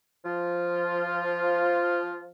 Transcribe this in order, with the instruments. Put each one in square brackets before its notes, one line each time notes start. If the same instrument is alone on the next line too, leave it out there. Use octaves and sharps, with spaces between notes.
[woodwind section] F3 F4